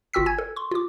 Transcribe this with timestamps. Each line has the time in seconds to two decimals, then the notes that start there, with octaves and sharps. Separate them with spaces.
0.14 G1 F4 F#4 G5 E6 B6
0.26 G#5 G#6
0.38 A4
0.56 C6 C#6
0.71 F4 D6